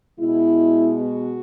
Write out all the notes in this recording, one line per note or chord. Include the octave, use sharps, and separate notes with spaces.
B2 G#3 B3 E4
F#4